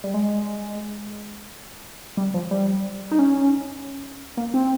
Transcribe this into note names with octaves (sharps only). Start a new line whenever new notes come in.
G3
G#3
G3
F3
G3
D#4
C#4
A#3
C4